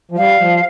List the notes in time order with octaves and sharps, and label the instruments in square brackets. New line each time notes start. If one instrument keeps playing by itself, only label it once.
[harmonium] F3
[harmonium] G3 [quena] F5
[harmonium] F3